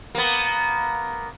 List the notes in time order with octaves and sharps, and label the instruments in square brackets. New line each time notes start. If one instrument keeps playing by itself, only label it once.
[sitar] A#3 B3